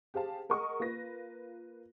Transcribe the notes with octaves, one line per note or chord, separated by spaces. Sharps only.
G4 G#4 C5 F5 A5
G#4 A#4 D#5 F#5 C#6 D#6
A#3 F4 B4 A#6